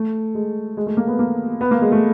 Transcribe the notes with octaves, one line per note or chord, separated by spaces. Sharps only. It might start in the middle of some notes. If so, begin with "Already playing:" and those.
Already playing: A3
G#3
G#3
A3
A#3
B3
A#3
B3
A#3
G#3
A3